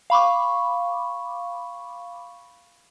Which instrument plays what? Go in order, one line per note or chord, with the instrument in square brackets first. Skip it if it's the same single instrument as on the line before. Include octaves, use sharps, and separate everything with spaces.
[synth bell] F5 B5 C#6 D6